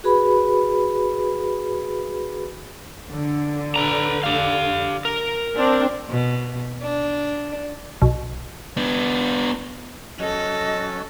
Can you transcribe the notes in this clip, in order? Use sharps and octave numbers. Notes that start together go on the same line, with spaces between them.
F#4 G#4 B4 B5
D3
B4 A#5
G4 F5
A#4
C4 D4
B2
D4
B1
B3 D4
F#3 C#4 A4 D#5